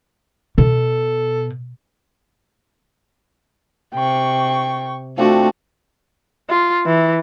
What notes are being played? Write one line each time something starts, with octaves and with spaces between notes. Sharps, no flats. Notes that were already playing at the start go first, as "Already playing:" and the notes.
B2 A4
C3 G5 C#6
F3 A3 C4 D4 F#4
F4
E3